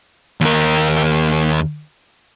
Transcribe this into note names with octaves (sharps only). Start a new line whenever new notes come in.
D#2 A#4